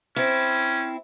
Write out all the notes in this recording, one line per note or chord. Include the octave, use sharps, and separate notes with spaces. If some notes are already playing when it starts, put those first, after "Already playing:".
C4 C#4 E4